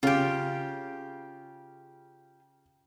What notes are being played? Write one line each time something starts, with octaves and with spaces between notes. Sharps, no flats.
C#3 F4 G4